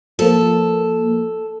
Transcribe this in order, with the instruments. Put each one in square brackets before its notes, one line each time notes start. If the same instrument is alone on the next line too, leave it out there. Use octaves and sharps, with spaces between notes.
[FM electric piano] F3 A#3 [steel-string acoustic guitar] A4